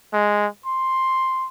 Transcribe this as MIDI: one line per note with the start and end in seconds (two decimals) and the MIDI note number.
0.13 0.47 56
0.66 1.48 84